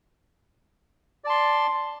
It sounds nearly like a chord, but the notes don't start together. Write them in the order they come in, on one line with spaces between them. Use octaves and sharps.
D5 A5 C6